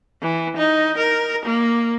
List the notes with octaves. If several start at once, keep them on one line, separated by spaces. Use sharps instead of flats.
E3
D#4
A#4
A#3